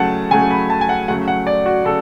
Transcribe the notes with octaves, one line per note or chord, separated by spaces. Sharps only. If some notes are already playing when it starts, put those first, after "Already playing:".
Already playing: C#3 F#3 A3 F#5 A5
C#3 F#3 A3 G#5
B5
A5
G#5
F#5
C#3 F#3 A3 F#5
F#5
D5
F#4
C#3 A4